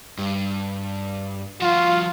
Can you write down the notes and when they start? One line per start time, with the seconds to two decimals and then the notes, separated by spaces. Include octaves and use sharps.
0.18 G2
1.61 F3 F4 F#4